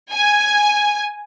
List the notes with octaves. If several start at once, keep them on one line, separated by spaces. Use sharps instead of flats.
G#5